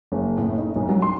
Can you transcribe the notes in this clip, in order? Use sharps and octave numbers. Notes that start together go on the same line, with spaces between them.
F#1
A2
D#4
B1
F#3
C6